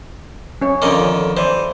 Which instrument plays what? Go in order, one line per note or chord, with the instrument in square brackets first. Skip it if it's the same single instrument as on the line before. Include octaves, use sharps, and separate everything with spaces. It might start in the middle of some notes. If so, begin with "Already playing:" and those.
[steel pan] C#4 C#5
[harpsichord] F2 D3 D#3 [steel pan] C#4 D6
[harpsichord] E3 [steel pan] C5 D5